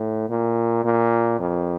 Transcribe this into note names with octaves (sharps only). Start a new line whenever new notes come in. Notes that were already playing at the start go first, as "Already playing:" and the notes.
Already playing: A2
A#2
A#2
F2